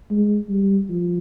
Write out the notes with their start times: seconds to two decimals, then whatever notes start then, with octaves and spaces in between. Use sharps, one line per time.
0.11 G#3
0.49 G3
0.89 F3